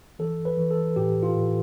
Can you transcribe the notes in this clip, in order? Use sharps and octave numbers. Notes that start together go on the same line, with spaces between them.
E3 A4
B4
E3
A4
A2 G4
F4
A2